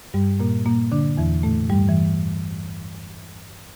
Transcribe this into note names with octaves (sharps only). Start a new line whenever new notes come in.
G2 G3
A#2 A#3
A#2 A#3
D3 D4
E2 E3
A2 A3
G2 G3
E3